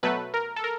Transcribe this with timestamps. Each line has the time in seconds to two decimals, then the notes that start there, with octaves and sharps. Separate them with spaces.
0.03 B2 F#3 A3 B4
0.34 A#4
0.56 A4
0.64 A#4